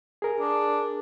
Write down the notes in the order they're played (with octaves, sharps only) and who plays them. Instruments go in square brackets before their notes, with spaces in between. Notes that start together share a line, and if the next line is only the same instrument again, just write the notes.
[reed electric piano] G#4 A#4
[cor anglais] D4